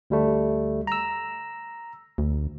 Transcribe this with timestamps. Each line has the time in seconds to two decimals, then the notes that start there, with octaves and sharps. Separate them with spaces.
0.10 D2 G3 A3
0.87 A#5 E6
2.18 D2